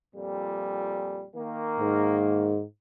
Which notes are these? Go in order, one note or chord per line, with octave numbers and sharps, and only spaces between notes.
F2 A#2 G3
D#3 A#3
G#2